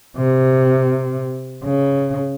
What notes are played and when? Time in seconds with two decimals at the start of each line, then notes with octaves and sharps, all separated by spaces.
0.17 C3
1.64 C#3